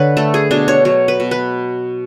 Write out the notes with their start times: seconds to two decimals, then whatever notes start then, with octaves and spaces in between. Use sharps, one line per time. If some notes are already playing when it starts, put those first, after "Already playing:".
Already playing: D3 B4 C#5
0.17 A3 A4
0.34 G#4
0.51 B2 D4
0.68 C#5
0.85 F#3 C#5
1.08 B4
1.20 B2
1.31 B4